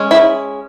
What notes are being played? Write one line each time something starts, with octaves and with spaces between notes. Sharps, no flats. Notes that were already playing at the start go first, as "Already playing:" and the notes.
Already playing: G#3 C#4
E4